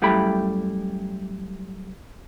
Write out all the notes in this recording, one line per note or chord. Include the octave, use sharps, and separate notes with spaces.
F#2 G3 A3 E4 G4 B5